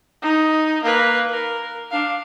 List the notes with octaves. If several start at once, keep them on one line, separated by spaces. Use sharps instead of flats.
D#4
A#3 B4
A#4
D4 F5